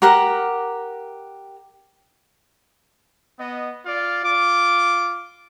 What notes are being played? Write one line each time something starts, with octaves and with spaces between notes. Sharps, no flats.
G4 A#4 F#5 A#5
B3 D#5
F4 D5 F5
F4 D6